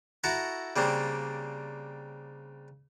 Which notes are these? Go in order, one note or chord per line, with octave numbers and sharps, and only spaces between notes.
E4 F#4 A4 A5 A#5 C#6
C#3 G3 A#3 C4 D4